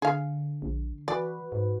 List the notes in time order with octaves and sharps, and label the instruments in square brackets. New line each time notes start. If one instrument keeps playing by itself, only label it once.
[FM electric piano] D3 [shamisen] G#4 F5
[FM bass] A#1
[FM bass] E3 [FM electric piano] F#4 B4 [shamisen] D5
[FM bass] G#2